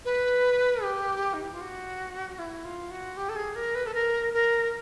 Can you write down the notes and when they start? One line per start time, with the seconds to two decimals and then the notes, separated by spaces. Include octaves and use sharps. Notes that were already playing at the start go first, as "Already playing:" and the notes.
0.05 B4
0.83 G4
1.34 D#4
1.42 E4
1.52 F4
1.61 F#4
2.39 E4
2.64 F4
2.91 F#4
3.17 G4
3.29 A4
3.36 G#4
3.55 A#4
3.75 B4
3.86 A4
3.94 A#4
4.33 A#4